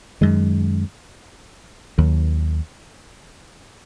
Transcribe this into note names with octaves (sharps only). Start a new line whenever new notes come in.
F#2 D#3 G#3
D#2 D#3 F#3